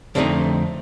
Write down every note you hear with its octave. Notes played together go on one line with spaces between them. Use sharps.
F2 D3 A3 C4 D4 D#4